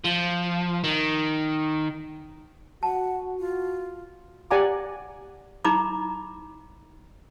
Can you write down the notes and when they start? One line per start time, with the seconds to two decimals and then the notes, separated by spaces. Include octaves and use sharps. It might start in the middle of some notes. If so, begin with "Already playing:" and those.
0.05 F3
0.84 D#3
2.83 F#4 F#5 A5
3.39 F4
4.51 G4 D5 F#5 G#5 A#5 D6
5.65 D#4 E4 A#5 B5 D6